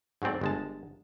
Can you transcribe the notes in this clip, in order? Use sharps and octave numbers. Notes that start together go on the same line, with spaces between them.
G#2 F#3 A3 C4 D5
G1 G#3 A5